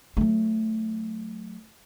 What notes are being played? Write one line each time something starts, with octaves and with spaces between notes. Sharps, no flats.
F#3 A3